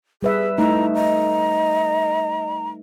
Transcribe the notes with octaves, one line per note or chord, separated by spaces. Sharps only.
G3 G#4 B4 E5
A3 D#4 E4 A#5
D#5 A#5